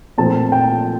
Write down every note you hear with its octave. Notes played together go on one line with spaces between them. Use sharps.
A#2 F3 A3 C4 A5
G5